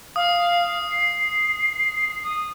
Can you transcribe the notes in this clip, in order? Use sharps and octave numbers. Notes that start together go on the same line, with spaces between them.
F5 D#6
C7
D#6